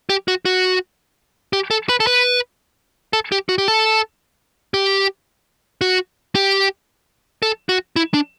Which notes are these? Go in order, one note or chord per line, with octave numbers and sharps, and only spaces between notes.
G4
F#4
F#4
G4
A4
B4
A4
B4
A4
G4
F#4
G4
A4
G4
F#4
G4
A4
F#4
E4
D4